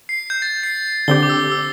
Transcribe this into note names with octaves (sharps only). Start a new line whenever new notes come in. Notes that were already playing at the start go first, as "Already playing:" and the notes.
C7
G6
A6
C7
D3 C4 G4 G7
D6
E6
E6